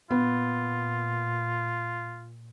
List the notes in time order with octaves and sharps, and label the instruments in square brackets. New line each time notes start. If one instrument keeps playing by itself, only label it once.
[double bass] A#2 [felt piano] B3 [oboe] F4